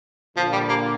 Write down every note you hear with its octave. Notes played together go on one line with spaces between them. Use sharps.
A#2 D3 F3
G3
A#3